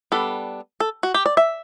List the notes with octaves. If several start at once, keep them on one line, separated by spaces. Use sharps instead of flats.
G3 B3 D4 A4
A4
F#4
G4
D5
E5